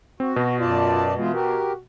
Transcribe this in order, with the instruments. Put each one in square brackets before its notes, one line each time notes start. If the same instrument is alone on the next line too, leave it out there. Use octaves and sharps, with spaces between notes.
[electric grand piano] C4 [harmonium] F#4
[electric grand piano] B2
[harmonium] F#2 D5 A5 [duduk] F4
[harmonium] E3 B3 F4 [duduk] G#3
[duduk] F#4 [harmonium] G4 A#4